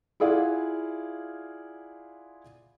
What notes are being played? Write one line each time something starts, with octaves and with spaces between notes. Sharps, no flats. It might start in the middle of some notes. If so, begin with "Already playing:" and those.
E4 F4 G#4 D5 F5 F#5